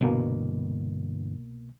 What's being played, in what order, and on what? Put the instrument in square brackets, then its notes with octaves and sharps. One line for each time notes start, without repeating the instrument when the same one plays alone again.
[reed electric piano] C2 B2 A#3 [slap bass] G2 D3 E3